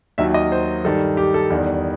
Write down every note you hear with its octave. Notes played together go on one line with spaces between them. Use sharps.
D#2 D#3 F#3 E5
D#5
C5
G2 D#3 G3 A4
G4
A4
E2 D#3 G3